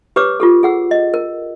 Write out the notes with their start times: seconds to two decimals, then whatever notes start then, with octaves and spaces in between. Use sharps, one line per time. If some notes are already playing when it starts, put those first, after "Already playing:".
0.16 G4 B4 C#5 D6 E6
0.40 F4 G4 A4
0.63 G#4 F#5 E6
0.91 D#5
1.14 A#4